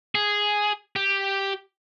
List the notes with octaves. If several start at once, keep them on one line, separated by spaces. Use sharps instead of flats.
G#4
G4